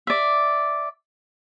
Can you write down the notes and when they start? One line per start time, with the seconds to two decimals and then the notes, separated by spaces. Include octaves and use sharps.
0.07 D5 E5